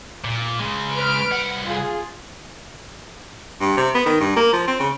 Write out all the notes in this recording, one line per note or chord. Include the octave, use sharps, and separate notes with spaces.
A#2
C#3 G#3
B4 F6 D7
C2 F#5
F4 G#4
G2
C3
B3
D#3
G2
A#3
F3
C4
C#3